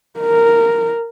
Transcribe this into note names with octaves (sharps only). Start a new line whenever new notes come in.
A#4